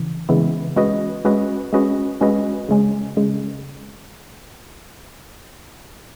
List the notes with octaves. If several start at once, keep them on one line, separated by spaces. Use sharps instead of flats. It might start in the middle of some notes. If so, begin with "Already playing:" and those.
Already playing: C#3 E3
C#3 E3 G#3 B3 E4
G#3 C#4 F#4 B4 D#5
G#3 C#4 F#4 B4 D#5
G#3 C#4 F#4 B4 D#5
G#3 C#4 F#4 B4 D#5
C#3 G#3 C#4
C#3 G#3